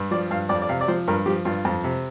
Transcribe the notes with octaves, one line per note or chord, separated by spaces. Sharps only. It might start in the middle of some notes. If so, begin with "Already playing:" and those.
Already playing: G2
F3 D5
G2 F5
F2 D5
D5
C3 F5
D5
F3 C5
G2 A#4
F3 G4
G2 F4
F2
C3